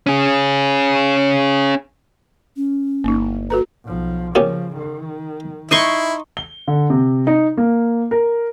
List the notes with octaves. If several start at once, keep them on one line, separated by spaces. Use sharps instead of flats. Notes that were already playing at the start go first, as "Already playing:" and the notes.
C#4 G#4
C#4
G1 A#3 D#4
F#4 A4 B4 A#5
B1 F3
A#2 C#3 F3 C#4 G4
D#3
D#4 E4 C6 C#6 D#6
G7
D3
C3
D#4
A#3
A#4